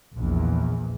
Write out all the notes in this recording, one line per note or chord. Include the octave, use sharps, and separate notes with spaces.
A#1 E2